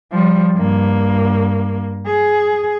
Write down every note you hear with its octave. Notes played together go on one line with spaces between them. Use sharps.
F3 G3
G2 A#3
G#4